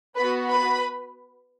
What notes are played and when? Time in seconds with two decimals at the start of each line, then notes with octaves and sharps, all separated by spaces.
0.16 B3 F#4 B4 B5
0.50 B4 B5